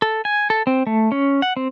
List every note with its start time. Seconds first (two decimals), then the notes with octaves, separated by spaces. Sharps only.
0.02 A4
0.25 G#5
0.50 A4
0.67 C4
0.87 A3
1.12 C#4
1.42 F#5
1.57 C4